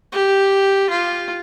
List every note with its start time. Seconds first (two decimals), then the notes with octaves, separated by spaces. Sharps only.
0.12 G4
0.90 F4